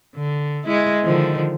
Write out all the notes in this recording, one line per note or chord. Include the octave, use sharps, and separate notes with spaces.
D3
G#3 E4
D3 D#3 F3